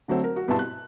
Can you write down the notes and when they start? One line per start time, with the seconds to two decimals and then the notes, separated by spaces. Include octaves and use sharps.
0.08 D3 F#3 A3 C4
0.24 A#4
0.36 F#4
0.48 G2 B2 E4 A5 C6
0.59 F#6